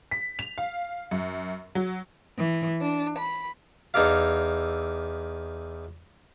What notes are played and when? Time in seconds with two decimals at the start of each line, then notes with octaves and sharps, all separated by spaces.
0.11 B6
0.39 F7
0.58 F5
1.11 F#2
1.75 F#3
2.37 E3
2.82 D4
3.17 B5
3.94 E2 D#4 A4 D5 F5